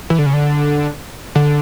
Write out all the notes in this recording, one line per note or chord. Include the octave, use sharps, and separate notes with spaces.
E3
D3
C#3
D3
D3